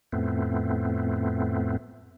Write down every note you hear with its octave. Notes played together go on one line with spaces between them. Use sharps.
F2 A2 A3 B3 C4